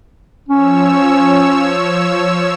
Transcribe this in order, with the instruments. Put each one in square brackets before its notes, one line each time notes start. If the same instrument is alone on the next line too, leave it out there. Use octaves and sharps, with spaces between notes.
[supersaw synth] F3 C#5 E6 [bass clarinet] C#4